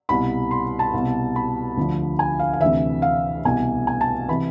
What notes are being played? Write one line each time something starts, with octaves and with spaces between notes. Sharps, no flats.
C2 B2 B5
C6
A5
C2 B2
B5
D2 D3 F3
G#5
F5
F5
D2 C3 E3 E5
F5
C2 B2 G#5
G#5
A5
C3 E3 B5